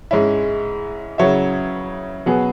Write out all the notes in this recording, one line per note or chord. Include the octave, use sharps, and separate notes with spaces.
G#2 G#3 C#4 E4
C#3 F#3 E4 C#5 E5
B2 F#3 B3 G#4 B4